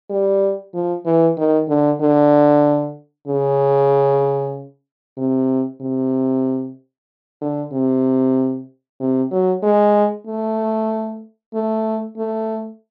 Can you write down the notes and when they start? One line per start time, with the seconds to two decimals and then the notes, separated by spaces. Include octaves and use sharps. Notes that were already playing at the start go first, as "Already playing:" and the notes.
0.10 G3
0.74 F3
1.06 E3
1.37 D#3
1.69 D3
2.01 D3
3.28 C#3
5.18 C3
5.81 C3
7.41 D3
7.72 C3
9.00 C3
9.31 F#3
9.63 G#3
10.27 A3
11.54 A3
12.18 A3